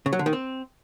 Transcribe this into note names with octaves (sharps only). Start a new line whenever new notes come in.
C#3
F#3
D3
D#3
C4